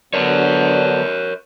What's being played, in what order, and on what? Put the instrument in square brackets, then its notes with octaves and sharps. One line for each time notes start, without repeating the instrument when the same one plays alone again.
[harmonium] D3 F#3 B3 [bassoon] D4 [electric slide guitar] A#4 C#5